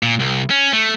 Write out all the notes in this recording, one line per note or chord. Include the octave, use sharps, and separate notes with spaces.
A#2
C2
C#4
A3